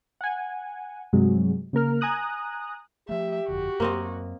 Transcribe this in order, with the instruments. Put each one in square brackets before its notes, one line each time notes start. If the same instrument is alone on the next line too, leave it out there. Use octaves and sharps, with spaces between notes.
[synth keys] F#5 G#5
G2 C3 F#3 G#3
C#3 A#3 A#4 F6
G#5 A#5 D#6 F#6
[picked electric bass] F3 A3 [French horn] G4 [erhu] E5
[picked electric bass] G1 F2 D3 [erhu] F#4
[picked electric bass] F#2 [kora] A#3 C4 D#5